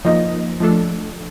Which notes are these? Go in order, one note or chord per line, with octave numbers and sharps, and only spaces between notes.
F3 A#3 D#4 D#5
F3 A3 D4 A4